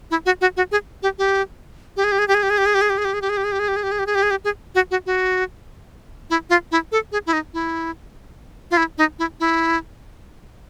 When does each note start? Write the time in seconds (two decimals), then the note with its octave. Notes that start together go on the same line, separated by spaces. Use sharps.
0.11 E4
0.26 F#4
0.41 F#4
0.57 F#4
0.72 G#4
1.03 G4
1.18 G4
1.97 G4
2.04 G#4
2.12 G4
2.19 G#4
2.28 G4
2.34 G#4
2.43 G4
2.50 G#4
2.58 G4
2.66 G#4
2.74 G4
2.81 G#4
2.90 G4
2.98 G#4
3.05 G4
3.14 G#4
3.22 G4
3.29 G#4
3.37 G4
3.44 G#4
3.52 G4
3.59 G#4
3.68 G4
3.76 G#4
3.83 G4
3.92 G#4
3.99 G4
4.06 G#4
4.15 G4
4.23 G#4
4.31 G4
4.44 G#4
4.75 F#4
4.91 F#4
5.06 F#4
6.30 E4
6.50 F4
6.72 E4
6.92 A4
7.12 G#4
7.26 E4
7.33 D#4
7.54 E4
8.71 F4
8.77 E4
8.98 D#4
9.19 E4
9.40 E4